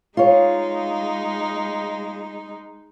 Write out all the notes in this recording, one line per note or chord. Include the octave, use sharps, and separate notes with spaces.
G#3 D#4 F4 C#5